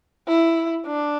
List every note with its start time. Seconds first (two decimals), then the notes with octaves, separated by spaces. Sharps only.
0.27 E4
0.86 D4